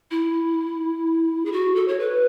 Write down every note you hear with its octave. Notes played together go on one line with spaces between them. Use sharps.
E4
G#4
F#4
A4
C#5
B4